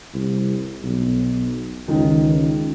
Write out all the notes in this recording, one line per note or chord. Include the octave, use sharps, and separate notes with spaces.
C2
B1
C#2 D#3